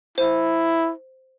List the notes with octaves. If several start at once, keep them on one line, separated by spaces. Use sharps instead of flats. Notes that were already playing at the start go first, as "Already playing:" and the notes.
E4 C5